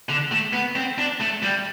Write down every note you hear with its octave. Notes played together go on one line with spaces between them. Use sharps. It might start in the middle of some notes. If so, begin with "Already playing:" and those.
D3
A3
B3
C4
D4
A3
G3